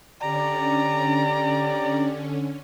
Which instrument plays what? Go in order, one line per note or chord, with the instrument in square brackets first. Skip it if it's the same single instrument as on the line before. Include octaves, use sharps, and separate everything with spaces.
[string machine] D3 C#4 [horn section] G4 D5 [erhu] A#5